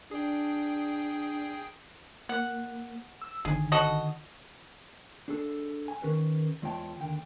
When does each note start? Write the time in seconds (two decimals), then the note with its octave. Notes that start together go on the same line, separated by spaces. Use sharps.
0.11 D4 G#4 G5
2.29 A#3 F#5
3.22 E6
3.45 G1 D3 D#3 G#4
3.72 F#4 A4 D#5
5.28 D4 G#4 A4
5.88 G#5
6.02 D#3 C#4 G#4 A#4 B4
6.62 E2 G#3 F4 C#5 G5 A5
6.99 D#2 D3 G5